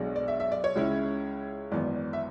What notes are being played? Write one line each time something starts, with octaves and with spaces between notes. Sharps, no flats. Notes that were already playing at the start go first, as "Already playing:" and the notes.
Already playing: B1 B2 G#3 D4
D5
E5
E5
D5
C#5
C#2 C#3 G#3 C#4 E4
G#1 F#2 E3 B3 D5
E5